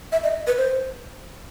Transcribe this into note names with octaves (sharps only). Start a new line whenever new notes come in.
E5
D#5
B4
C5